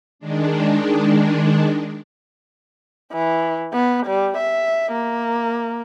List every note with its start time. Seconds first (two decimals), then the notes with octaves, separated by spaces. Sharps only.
0.19 D#3 G#3 D4
3.13 E3
3.73 B3
4.06 G3
4.37 E5
4.92 A#3